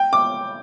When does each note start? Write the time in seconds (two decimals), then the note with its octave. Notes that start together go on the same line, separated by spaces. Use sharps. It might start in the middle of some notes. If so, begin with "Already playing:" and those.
Already playing: G5
0.13 D6